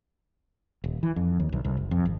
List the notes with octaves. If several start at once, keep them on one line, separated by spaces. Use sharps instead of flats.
D#1
E3
F2
D#2
B1
C2
F#1
F2
G#1